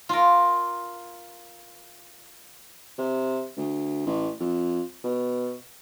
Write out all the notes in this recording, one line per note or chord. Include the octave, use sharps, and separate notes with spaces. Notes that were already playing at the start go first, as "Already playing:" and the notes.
F4 A#4
C3
D2
A1
F2
B2